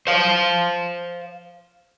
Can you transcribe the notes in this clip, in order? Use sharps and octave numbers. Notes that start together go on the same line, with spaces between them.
C5 F5